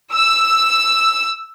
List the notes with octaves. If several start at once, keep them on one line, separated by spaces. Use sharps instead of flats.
E6